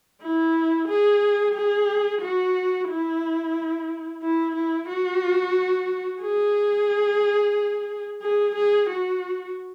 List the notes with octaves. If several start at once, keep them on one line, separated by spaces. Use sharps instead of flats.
E4
G#4
G#4
F#4
E4
E4
E4
F#4
G#4
G#4
G#4
F#4